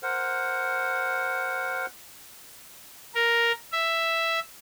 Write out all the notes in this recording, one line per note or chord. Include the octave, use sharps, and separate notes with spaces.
A#4 C5 F#5
A#4
E5